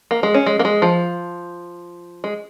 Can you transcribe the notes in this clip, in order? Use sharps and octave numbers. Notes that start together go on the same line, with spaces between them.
A#3
G#3
C#4
G#3
A#3
G#3
F3
G#3